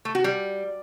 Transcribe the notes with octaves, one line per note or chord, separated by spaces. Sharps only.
A3
F#4
G3